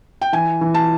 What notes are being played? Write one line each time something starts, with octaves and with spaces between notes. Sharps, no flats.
G5
E3 G#5
E3
A5